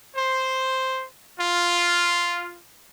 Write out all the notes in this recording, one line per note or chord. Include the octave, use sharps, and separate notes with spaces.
C5
F4